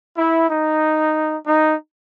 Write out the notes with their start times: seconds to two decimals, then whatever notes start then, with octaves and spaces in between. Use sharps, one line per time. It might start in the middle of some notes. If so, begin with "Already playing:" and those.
0.16 E4
0.49 D#4
1.46 D#4